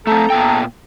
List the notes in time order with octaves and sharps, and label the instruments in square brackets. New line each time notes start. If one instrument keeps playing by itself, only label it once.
[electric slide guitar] A3 C4 [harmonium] A4 A#5
[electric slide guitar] A#2 B3 G5